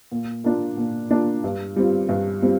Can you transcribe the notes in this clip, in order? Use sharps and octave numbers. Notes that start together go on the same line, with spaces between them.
A#2
A#3 D4 F4
A#2
A#3 D4 F4
G2
G3 C4 F4
G2
G3 C4 F4